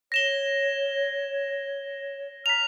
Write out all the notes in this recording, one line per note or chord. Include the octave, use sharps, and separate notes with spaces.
C#5 A#6 E7 G7
A#5 F6 F#6 B6 F7